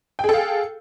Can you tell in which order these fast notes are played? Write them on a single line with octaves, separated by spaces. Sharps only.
G5 G#4 A4 F5